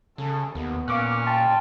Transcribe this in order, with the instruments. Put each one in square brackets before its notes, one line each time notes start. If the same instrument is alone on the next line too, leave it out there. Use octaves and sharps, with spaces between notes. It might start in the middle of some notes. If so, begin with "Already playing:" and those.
[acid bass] C#3 [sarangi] A4
[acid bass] D#2 [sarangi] B3
[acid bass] A#2 [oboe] C#4 [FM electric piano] F5 D6 F#6
[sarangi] G5 [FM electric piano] A5 C6